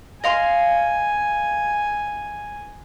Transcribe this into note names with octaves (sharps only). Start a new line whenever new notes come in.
D#5 F5 G#5 C6